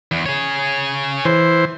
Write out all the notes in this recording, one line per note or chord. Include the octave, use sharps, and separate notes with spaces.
E2
G#4 C#5
E3 C5